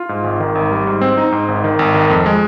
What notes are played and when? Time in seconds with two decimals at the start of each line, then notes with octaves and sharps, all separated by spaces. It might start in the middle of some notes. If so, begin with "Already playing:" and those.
Already playing: F4
0.09 G#2
0.24 G#1
0.40 D#3
0.55 G#1
0.71 G3
0.87 G#2
1.01 C4
1.17 D#4
1.32 G#2
1.48 G#1
1.64 D#3
1.79 G#1
1.94 D#3
2.10 F2
2.26 G#3